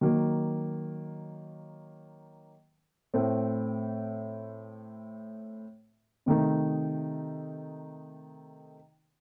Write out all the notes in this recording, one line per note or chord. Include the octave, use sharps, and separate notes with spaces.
D#3 F#3 A#3
A2 A3 C4
C3 D#3 A3 D#4